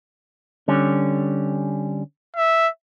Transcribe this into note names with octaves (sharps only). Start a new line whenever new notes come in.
D3 G3 C#4
E5